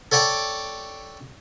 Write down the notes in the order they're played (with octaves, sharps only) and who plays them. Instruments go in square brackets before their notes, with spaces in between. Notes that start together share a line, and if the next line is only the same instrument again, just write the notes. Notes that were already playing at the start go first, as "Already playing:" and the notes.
[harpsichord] A4 C#5 D5 G5 A5